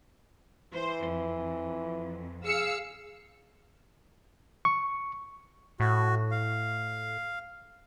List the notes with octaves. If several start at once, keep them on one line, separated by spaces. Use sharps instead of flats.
E3 C5
F2
G#4 F5 E6 C#7
C#6
A2 F#4
F5